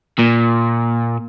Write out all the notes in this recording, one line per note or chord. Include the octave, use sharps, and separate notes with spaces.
A#2